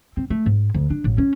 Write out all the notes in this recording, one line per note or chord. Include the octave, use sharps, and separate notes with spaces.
C4
A3
G#2
D2
D4
A1
C#4